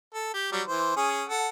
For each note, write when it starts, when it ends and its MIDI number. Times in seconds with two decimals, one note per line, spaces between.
0.14 0.33 69
0.34 0.50 67
0.52 0.62 54
0.52 0.62 55
0.67 0.92 52
0.67 0.92 72
0.96 1.24 61
0.96 1.24 68
1.29 1.49 69
1.29 1.49 78